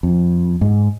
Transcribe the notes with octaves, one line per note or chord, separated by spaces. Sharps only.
F2
G#2